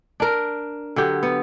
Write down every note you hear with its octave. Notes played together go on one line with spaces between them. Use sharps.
D4 A#4
D3 F#3 G4
B3